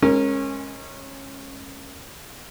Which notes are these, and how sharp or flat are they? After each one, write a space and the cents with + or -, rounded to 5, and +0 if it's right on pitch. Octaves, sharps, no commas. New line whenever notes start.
G#3 +0 C#4 -20 A#4 +0